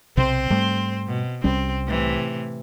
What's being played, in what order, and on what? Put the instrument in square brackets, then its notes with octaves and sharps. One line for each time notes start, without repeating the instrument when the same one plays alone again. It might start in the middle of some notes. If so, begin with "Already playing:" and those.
[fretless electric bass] B1 C3 [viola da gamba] C4 C5
[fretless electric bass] G#2 G3 A3
[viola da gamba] B2
[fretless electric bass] C2 G3 C#4 [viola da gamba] C4
[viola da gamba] A2 C3 E3